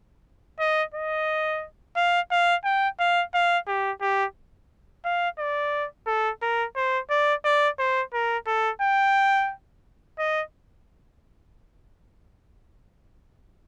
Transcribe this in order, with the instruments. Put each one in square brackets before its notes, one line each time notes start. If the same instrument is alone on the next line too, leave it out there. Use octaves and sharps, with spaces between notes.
[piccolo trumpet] D#5
D#5
F5
F5
G5
F5
F5
G4
G4
F5
D5
A4
A#4
C5
D5
D5
C5
A#4
A4
G5
D#5